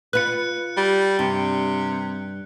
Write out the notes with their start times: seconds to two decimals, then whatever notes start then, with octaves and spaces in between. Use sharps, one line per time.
0.13 F4 B4 F#6 C#7
0.77 G3
1.19 G2 C3